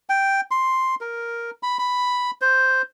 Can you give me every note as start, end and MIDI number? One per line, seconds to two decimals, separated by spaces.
0.09 0.41 79
0.51 0.95 84
1.01 1.50 70
1.63 1.77 83
1.79 2.31 83
2.41 2.82 72